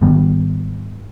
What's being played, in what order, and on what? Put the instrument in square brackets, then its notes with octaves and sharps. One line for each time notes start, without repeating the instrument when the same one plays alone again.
[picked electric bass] G#1 D#3 G3 B3